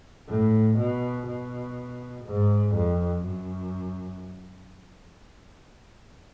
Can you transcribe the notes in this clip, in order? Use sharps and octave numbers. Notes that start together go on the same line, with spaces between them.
A2
B2
B2
G#2
F2
F#2